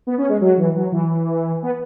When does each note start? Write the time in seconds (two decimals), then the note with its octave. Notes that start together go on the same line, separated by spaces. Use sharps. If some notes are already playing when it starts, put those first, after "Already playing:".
0.07 B3
0.18 C#4
0.29 G#3
0.41 F#3
0.58 E3
0.75 F#3
0.92 E3
1.63 B3